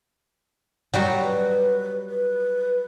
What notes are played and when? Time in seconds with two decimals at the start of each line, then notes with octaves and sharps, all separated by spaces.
0.93 F#3 G3 F#4
1.23 B4
2.10 B4